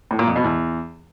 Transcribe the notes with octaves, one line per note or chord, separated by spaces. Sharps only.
A2
A#2
F2
B2
E2